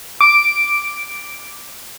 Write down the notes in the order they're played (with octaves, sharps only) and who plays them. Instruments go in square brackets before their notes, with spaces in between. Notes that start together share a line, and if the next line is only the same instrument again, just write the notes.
[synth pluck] D6 D7